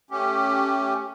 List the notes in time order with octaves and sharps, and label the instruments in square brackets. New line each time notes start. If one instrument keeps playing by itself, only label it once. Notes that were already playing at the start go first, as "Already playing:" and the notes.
[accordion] A3 C#4 G4